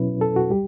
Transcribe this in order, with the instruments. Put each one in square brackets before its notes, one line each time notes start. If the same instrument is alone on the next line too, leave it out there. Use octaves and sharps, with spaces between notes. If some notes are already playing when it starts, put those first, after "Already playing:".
Already playing: [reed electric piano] B2 F#3 C#4 E4 B4
A4
F#4
G3 G4